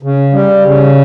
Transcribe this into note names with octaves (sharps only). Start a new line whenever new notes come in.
C#3
G3
C#3